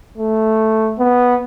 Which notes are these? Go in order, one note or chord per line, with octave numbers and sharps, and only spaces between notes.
A3
B3